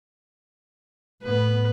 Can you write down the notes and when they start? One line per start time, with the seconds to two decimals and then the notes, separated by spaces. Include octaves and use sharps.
1.24 A2 B3 B4